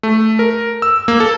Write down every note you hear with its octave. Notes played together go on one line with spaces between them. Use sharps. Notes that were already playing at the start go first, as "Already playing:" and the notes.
A3
A#4
E6
A#3
A4